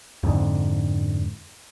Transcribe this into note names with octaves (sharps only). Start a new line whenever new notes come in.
F2 G#2 D3